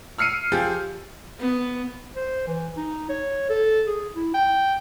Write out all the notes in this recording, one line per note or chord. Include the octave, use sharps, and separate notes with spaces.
E6 F6 C7 C#7 D#7
F3 G4 G#4
B3
C5
E3
D#4
C#5
A4
G#4
E4
G5